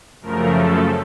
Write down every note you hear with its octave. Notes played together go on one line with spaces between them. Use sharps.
F#2 C#3 F3 A3 A#4
A4